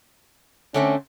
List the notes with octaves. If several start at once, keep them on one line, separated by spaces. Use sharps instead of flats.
D3 A3 C4 C#4